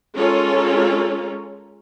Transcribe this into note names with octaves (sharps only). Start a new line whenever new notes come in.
G#3 C#4 F4 A4 A#4 C#5